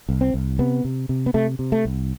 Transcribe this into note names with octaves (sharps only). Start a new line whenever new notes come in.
C2
C4
C2
C3 B3
C3
C3
B3
C3 A3
C3
A3
C2